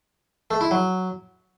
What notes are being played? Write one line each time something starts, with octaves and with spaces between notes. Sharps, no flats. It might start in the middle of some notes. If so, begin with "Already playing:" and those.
A3
E4
F#3